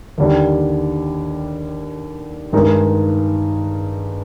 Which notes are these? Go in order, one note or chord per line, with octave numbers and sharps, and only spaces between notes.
D#2 D3 G3 D4
G2 D#3 G#3 D#4 A#4